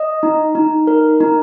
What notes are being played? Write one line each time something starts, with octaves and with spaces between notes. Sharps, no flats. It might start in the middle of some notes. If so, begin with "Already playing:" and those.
Already playing: D#5
D#4
D#4
A#4
D#4